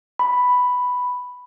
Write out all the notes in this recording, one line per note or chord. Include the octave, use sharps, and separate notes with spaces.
B5